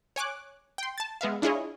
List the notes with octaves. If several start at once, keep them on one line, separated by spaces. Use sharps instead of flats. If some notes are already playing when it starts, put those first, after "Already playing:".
C#5 G#5 D6 F#6
G5 C6
A5 A6
G#3 B3 E5 F5
D4 E4 F4 G#4 C#5 D#5